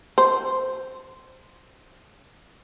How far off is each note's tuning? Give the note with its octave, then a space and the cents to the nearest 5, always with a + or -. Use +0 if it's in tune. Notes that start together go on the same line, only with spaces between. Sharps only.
C5 -5